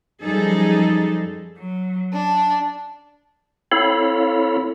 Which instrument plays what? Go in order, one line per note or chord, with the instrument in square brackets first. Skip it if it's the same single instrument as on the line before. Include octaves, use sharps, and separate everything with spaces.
[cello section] F#2 F3 G3 D#4 G#4 A4
[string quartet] F#3
D4
[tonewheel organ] C4 E4 A4 C#5 F5 B5